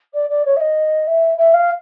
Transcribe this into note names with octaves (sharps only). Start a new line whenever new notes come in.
D5
D5
C#5
E5
D#5
E5
E5
F5